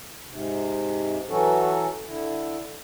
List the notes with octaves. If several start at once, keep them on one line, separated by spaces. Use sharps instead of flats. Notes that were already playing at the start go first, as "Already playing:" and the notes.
G#2 C3
E3 F#3 C#4 F#4 A4
D3 E4